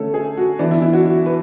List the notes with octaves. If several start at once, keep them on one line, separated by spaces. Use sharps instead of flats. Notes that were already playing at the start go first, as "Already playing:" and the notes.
Already playing: D3 A3 C#4 A4
G#4
F#4
E3 B3 D4
E4
E4
F#4
F#4
B4